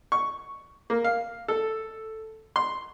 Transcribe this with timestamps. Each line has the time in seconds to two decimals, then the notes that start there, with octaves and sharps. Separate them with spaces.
0.12 C#6
0.90 A#3
1.04 F5
1.48 A4
2.56 C6